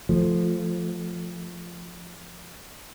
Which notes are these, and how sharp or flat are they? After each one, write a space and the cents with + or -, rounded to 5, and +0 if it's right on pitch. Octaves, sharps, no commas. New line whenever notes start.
F3 +0 A3 +0